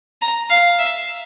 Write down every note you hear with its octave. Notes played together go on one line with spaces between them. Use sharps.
A#5
F5
E5